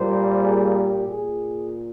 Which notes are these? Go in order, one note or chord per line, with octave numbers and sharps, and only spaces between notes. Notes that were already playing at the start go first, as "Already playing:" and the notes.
Already playing: A#2 G3 A#3 C5
G#4
G4
A#2 G#4